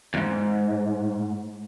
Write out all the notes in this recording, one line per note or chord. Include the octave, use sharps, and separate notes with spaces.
E2 G#2